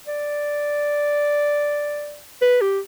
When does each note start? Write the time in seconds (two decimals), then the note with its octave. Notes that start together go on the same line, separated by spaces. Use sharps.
0.07 D5
2.42 B4
2.61 G4